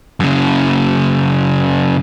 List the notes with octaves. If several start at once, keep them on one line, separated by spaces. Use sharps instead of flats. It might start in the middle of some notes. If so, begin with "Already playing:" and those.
F#2 C#3